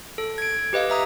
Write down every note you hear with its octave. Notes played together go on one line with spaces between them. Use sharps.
A4
G#6 D7
G4 B4 D#5 F5
E5 A#5 D#6